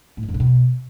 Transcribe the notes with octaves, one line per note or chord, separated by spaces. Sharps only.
A2
F#2
F2
A#2
B2